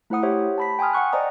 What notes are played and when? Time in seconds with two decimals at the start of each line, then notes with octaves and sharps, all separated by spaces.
0.10 A3 E4 C5 F#5 D#6
0.23 G4 C5 C#5 E5 F#5
0.58 A5 B5 B6
0.79 G5 G#5 C6 D#6 F6
0.93 F#5 G5 C#6 F#6
1.12 C5 D5 D#5 A#5 D#6